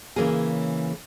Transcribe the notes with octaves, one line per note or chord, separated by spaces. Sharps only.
C#3 E3 A#3 C#4 G#4